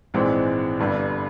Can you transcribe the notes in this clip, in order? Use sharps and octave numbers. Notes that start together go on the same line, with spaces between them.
A#1 G#2 E3 G#3 C4
G1 G2 D3